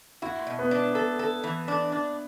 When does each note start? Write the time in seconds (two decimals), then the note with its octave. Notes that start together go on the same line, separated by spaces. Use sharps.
0.22 E4 F#4
0.47 B2
0.59 B3
0.71 D4
0.95 A4
1.19 A4
1.44 E3
1.68 D4
1.92 D4